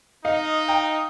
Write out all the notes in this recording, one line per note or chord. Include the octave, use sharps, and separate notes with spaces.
D#4 D#5 F5 D#6
G5 A#5